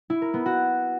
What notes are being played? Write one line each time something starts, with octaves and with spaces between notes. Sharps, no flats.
E4
A#4
B3
F#4